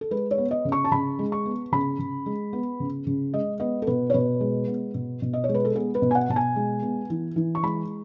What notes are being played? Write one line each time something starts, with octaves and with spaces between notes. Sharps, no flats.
A4
G#3 B4
C#5
B3
D#5
C#3
C#6
A5
C#3 B5
G#3
C#6
B3
C#3 B5
C#3
G#3
B3
C#3
C#3
G#3 D#5
B3 D#5
A4
B2 B4
C#5
B2 B4
G#3
B3
B2
B2
D#5
C#5
G#3
B4
A4
B3 G#4
B4
B2
G#5
F#5
B2 A5
G#5
G#3
B3
E3
E3
C#6
G#3 B5